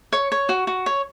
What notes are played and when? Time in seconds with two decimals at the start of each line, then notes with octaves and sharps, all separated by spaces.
0.13 C#5 C#6
0.32 C#5
0.49 F#4
0.67 F#4
0.86 C#5